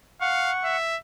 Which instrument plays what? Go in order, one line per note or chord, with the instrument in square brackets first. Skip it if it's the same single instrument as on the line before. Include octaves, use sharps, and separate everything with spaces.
[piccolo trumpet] F5 [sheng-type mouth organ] F#5 C#6
[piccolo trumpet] E5